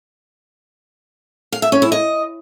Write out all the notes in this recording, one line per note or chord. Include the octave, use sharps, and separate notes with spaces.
F5
E5
C#4
E4
D#5